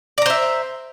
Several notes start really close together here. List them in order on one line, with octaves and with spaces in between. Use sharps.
D5 A#5 C5 E5